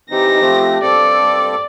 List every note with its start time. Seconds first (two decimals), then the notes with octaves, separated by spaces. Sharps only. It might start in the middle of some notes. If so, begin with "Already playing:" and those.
0.11 E3 C4 D#4 G4 A#6
0.41 F3 A3 C4
0.82 G2 C4 A4 D5